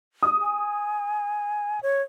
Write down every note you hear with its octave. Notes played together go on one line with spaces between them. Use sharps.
D#6
G#5
C#5